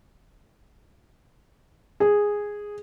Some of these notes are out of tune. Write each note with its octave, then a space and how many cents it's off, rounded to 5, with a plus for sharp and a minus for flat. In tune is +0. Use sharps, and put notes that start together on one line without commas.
G#4 -5